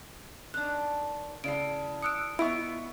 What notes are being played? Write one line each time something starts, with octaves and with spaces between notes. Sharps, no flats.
D#3 D4 F#6
A2 C#3 E4 D5 C7 D7
D#6 E6 F#6 C#7 D7
B3 E4 F4 D#5 E5 C#6 D7